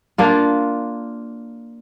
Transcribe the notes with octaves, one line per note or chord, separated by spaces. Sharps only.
A#3 D4 F4